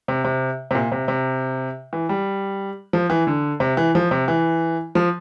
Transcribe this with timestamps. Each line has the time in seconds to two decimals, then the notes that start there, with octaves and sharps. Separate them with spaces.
0.08 C3
0.25 C3
0.71 C3
0.75 A#2
0.92 C3
1.08 C3
1.93 E3
2.09 G3
2.93 F3
3.10 E3
3.27 D3
3.60 C3
3.77 E3
3.95 F3
4.11 C3
4.28 E3
4.95 F3